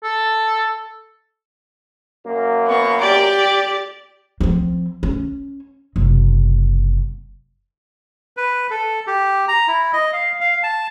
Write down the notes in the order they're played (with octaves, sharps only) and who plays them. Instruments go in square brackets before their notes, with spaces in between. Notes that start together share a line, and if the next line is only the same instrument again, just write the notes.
[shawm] A4
[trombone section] F#2 A#3
[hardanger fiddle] B3 C#6
[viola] G4 D5 [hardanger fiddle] G5 D6
[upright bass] F3 C4
C#4
F#1 C3
[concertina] B4
A4
G4
A#5
E4
D#5
F5
F5
A5